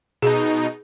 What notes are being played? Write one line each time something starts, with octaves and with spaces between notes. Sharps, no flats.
B2 D#4 G#4